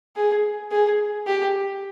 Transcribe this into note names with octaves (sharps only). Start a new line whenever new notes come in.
G#4
G#4
G4